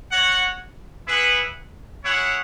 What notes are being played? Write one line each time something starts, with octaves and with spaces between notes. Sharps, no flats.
F#4 C#5 F#5
E4 G#4 B4 F#5
E4 G#4 C#5 F#5